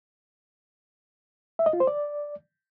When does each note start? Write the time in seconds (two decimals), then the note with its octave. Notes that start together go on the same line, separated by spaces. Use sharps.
1.59 E5
1.66 D#5
1.73 F4
1.80 C5
1.87 D5